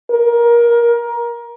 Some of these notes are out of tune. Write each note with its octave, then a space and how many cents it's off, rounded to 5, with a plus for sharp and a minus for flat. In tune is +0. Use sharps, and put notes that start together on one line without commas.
A#4 +20